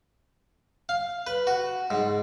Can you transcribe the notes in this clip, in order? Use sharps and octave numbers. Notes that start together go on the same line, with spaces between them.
F5
B4
F#4
G#2